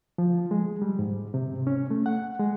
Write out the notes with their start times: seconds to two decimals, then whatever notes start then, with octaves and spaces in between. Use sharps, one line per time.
0.18 F3
0.51 G#3
0.82 G3
0.99 G#2
1.34 C3
1.67 C#4
1.90 A3
2.06 F#5
2.39 G#3